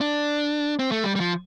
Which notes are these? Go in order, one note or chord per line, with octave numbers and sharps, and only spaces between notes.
D4
C4
A3
G3
G3
F3